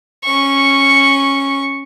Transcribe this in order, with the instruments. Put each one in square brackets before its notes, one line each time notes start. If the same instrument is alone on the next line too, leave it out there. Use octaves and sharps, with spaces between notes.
[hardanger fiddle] C#4 C#6